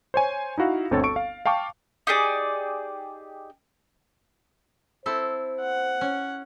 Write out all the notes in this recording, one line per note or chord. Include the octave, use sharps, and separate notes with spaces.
C5 C#5 G#5
D#4 E4 F#4 F5
G1 D2 C4 A4 C#5 A6
A4 C#6 D7
F5
F5 G5 A5 C#6 D6
D#4 G4 G#4 D5
C4 E4 A4 C5
F#5
C#4